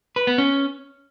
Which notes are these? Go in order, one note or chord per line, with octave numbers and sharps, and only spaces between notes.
B4
B3
C#4